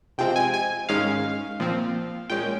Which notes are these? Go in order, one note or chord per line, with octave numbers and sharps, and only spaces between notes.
C3 F3 G#3 C4 G5
G#5
G#5
G#2 D#3 G#3 C#4 F5
A#2 F3 C4
A#2 G#3 C#4 G5